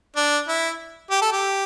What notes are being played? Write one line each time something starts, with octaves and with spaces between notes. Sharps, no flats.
D4
E4
G4
A4
G4